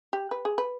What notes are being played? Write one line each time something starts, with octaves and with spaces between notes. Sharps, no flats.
G4
B4
G#4
B4